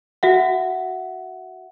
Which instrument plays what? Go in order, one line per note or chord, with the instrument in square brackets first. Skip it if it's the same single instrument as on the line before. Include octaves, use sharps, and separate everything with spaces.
[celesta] F#4 E5 F#5